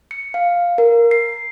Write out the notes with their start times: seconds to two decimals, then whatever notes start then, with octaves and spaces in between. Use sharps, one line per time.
0.11 C#7
0.34 F5
0.78 A#4
1.11 C7